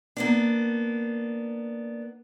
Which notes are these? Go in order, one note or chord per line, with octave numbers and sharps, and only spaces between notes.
A#3 B3 D4